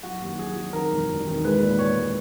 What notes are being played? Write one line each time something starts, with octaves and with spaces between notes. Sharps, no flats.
F#3 F#4
D#2
F#3 G#4
F#3
D#3 A#4
E1
E1
D#3
G#3 B4
A#2
B4
A#2 C#5
G#3